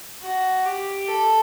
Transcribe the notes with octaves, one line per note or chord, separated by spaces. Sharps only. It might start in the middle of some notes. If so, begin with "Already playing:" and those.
F#4
G4
A4